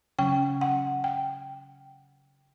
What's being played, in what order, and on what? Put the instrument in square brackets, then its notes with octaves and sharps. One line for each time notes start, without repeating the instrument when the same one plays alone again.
[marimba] C#3 F#3 C#4 G5
F#5
G5